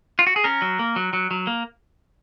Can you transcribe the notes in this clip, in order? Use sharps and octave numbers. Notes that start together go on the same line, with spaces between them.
F4
F#4
G#4
C#4 A#4
F#3
A#3
F#3
F#3
F#3
A#3